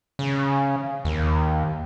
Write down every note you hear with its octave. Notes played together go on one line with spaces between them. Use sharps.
C#3
D#2